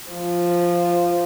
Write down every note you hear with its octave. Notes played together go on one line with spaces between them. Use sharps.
F3